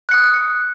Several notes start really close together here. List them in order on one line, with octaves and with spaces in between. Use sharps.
F#6 C#7 D#6